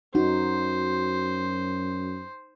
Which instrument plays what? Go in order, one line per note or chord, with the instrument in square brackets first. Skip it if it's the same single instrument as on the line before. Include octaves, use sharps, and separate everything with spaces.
[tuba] F#2 [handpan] D#4 [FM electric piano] F#4 [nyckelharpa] C5